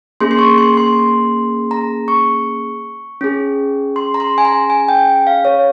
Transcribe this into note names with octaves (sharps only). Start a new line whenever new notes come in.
A#3 C#4 G#4 C6
C6
C#6
C6
C6
A#5
C#6
C#4 G#4
C6
A#5
C6
G#5
A#5
G#5
G5
F5
C#5